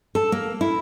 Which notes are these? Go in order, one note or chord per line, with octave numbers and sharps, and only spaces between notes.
A4
A#3
E4